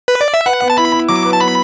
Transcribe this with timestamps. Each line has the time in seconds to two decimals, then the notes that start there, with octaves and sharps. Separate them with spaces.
0.08 B4
0.21 D5
0.34 E5
0.46 B4 F#5
0.62 B3
0.70 A5
0.77 E4 B5
0.93 E4
1.09 F#3 D6
1.25 B4
1.33 A5
1.41 B3 B5